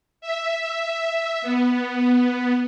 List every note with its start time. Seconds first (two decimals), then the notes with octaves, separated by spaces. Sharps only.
0.21 E5
1.42 B3